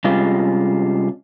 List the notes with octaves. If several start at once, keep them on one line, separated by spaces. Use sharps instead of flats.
C3 G3 G#3 C#4 F4